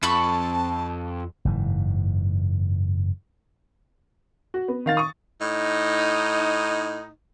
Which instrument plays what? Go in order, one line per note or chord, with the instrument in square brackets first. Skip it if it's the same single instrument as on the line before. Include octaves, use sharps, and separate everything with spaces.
[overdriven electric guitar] F2 [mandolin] A4 B5 C#6 [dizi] A5
[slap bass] F#1 G#2 E3
[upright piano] F#4
B3
D#3 F5 A6
C#6 D#6
[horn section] A2 D#4